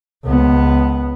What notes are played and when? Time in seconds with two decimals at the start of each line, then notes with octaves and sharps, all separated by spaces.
0.25 C#2 B3